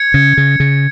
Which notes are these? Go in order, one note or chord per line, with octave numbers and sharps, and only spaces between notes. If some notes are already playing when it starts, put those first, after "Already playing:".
Already playing: G#6 C#7
C#3
C#3
C#3